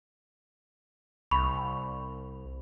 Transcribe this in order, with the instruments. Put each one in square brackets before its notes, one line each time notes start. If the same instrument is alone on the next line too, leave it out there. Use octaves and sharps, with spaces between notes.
[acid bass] C2 [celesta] B5 C#6 F7